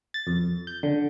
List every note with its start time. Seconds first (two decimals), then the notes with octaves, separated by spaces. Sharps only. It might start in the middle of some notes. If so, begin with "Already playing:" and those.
0.14 A6
0.27 F2
0.67 G6
0.83 D3